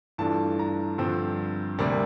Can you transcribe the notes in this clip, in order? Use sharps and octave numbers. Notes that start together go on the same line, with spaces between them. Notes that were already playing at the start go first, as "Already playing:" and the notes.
G2 E3 A3 D4 F4 A5
A#5
G2 D3 F3 C4
D2 C3 G3 A#3 D4